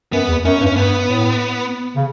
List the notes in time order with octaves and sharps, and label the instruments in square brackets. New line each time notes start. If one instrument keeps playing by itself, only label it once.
[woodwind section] F#2 [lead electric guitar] B3
[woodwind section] E2
[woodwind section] F#2 [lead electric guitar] C#4
[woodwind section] G2
[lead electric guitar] C#4
[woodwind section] G2 [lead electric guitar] B3
[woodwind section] A2
C#3